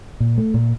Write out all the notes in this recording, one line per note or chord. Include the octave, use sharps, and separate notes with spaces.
A#2
A3
A#2